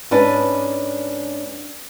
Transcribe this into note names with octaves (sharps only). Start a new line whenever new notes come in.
G#2 C#4 D4 B4 D#5 A5